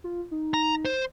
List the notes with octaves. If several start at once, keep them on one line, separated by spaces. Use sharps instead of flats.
F4
D#4
A#5
C5